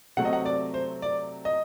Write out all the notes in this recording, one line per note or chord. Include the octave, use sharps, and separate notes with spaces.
C3 F#3 A3 C4 F#5
D#5
F#5
D5
C5
D5
D#5